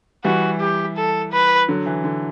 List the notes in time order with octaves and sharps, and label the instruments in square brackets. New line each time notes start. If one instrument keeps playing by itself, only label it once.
[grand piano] E3 G3 [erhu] F#4
[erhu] G4
A4
B4
[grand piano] D3 F#3
E3
D3